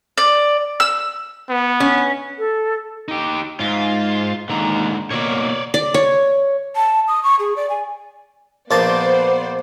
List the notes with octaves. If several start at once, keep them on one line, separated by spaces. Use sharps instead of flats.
D5
E6
B3
C#4
A4
D#4 G4
G#2 F4
D#2 G#2 D3 A#5
B2 A#3 C#5 D5
D5
C#5
A5
D#6
C#6
G#4
D5
G#5
A#1 A#3 B3 C5 D5 A5